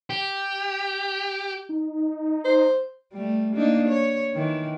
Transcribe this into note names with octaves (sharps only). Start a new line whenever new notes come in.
G4
D#4
C5
G3 A3
A#3 D4 D#4
C#5
D#3 E3